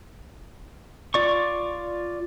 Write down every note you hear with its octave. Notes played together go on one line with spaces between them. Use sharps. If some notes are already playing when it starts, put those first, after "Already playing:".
F4 D5 C#6